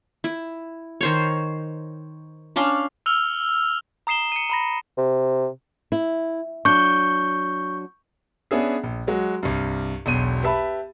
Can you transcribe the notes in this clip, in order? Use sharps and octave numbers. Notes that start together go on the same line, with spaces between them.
E4
D#3 C5 C#5
C#4 D4 F5 C6
E6 F6 F7 G7
A#5 D#6 C7 E7 G7
C#7 D#7
A#5 B5 A#6
C3
E4
F#3 D4 C#6 G6
B3 C#4 D4 G#4 E5
A#1
F#3 G#3 F#4
C2 G2
E1 B1 D#7
G4 B4 E5 A5 B5